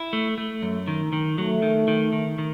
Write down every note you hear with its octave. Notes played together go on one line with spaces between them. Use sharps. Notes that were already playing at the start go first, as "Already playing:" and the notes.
Already playing: E4
A3
A3
F#2
D#3
D#3
F#3 A3
D#3
D#3
D#3
D#3